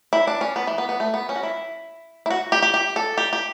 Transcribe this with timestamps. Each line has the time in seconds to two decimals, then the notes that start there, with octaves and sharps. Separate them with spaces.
0.13 E4
0.27 D4
0.41 C#4
0.56 B3
0.67 E3
0.78 B3
0.89 B3
1.00 A3
1.14 B3
1.29 C#4
1.36 F#4
1.43 E4
2.26 E4
2.30 F#4
2.52 G4
2.62 G4
2.74 G4
2.96 A4
3.18 G4
3.33 G4